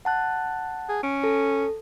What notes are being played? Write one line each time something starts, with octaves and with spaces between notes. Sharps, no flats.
F#5 A5 F#6
G#4
C#4 D7
A4